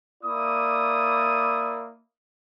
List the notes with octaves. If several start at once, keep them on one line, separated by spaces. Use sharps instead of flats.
A#3 E4 D5 D#6